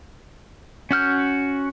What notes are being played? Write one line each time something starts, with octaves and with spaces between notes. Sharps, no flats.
C#4 F#4 F6 G6